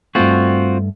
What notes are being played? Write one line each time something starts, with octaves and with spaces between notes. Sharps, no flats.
G2 A3 C4 F4 F#4